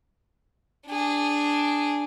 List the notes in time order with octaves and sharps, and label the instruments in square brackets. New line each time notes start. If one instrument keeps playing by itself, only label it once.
[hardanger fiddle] D4 G#4